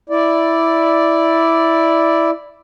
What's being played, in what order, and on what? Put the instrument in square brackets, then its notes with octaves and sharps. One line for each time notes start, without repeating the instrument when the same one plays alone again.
[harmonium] E4 D5